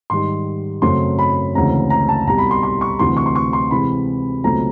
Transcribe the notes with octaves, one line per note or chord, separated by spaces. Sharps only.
G#2 D#3 G3 C6
F#2 C#3 F#3 A3 C4 C6
B5
D2 C#3 E3 G#3 C4 A#5
A#5
A5
C2 B2 G3 A#5
B5
C6
C6
C#6
D2 C3 E3 C6
C#6
C6
C#6
C6
C3 E3 G#3 B5
C#2 B2 F#3 A3 C4 A#5